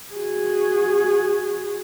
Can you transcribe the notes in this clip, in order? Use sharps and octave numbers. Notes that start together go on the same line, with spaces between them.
F#4 G#4